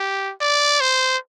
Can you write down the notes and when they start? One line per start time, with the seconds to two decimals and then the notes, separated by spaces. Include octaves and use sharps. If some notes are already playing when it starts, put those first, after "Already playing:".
Already playing: G4
0.41 D5
0.81 C5